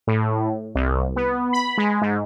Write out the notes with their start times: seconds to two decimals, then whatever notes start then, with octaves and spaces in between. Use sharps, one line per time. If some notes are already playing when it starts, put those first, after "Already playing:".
0.07 A2
0.75 C2
1.16 B3
1.53 B5
1.78 G#3
2.02 G#2